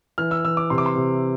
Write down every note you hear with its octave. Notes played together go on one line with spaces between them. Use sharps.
E3 F6
E6
E3 E6
D6
C3 C6
D6
C6
C3